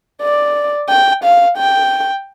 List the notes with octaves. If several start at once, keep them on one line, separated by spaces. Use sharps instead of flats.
D5
G5
F5
G5